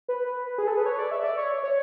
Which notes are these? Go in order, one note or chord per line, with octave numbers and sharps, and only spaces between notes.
B4
G#4
A4
B4
C#5
D5
E5
D5
C#5
C#5